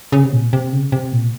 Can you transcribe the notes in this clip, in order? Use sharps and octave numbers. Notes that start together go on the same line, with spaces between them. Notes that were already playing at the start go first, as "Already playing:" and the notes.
C#3
C3
A#2
C3
C#3
C3
A#2